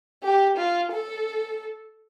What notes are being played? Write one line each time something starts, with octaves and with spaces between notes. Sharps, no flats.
G4
F4
A4